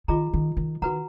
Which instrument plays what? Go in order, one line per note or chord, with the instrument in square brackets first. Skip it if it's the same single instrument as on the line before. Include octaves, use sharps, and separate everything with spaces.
[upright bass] D#3 [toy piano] F4 G#4 D#5 A#5
[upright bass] D#3
D#3
[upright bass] D#3 [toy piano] F#4 B4 F#5 A#5